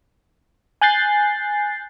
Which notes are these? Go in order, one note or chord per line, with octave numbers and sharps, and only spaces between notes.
G#5 F#6 G6 A6 C7